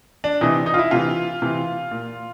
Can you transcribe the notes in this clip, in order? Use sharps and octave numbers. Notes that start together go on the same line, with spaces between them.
D4
C3 E3 D#4
D#4
F4
E4
C3 E3 F4
C3 E3
A#2